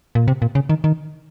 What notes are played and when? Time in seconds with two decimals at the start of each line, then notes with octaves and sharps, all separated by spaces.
0.15 A#2
0.28 C3
0.42 A#2
0.55 C#3
0.69 D#3
0.84 D#3